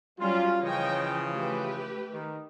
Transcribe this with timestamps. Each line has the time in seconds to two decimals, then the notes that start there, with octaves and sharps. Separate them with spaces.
0.19 F#3 G3 C#4 F4
0.61 C#3 E3 F3 C#5 D#5 G5
1.33 A3 G4 B4
2.11 D#3